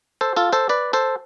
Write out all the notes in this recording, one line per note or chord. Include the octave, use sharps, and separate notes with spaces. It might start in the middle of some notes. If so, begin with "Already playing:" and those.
A4 C5
F4 A4
A4 C5
B4 D5
A4 C5